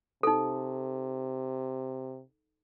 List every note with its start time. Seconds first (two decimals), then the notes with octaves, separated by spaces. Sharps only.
0.23 C3 D#4 A4